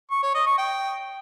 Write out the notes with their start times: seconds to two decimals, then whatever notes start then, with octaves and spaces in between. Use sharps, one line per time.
0.11 C#6
0.23 C#5
0.35 D#5
0.46 C#6
0.58 G5